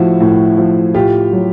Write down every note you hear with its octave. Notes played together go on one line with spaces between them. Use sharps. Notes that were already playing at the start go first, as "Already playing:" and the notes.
Already playing: A2 F3 E4 F#4
A2
F3
A2 F4 G4
F#3